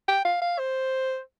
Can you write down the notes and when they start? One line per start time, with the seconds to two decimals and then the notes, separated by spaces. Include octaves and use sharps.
0.08 G5
0.25 F5
0.42 F5
0.59 C5